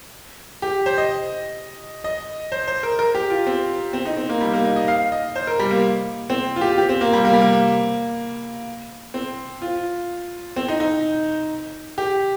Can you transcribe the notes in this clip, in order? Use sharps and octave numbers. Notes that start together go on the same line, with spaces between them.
G4
C5
D#5
D#5
C5
C5
A#4
A#4
G4
F4
C4
C4
D#4
C4
A#3
G3
A#3
D#4
D#5
F5
D#5
C5
A#4
G3
A#3
C4
F4
G4
G4
C4
A#3
G3
A#3
G3
A#3
C4
F4
C4
D#4
D#4
G4